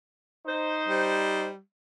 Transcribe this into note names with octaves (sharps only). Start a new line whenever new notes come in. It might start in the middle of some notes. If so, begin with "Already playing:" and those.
D#4 C5
G3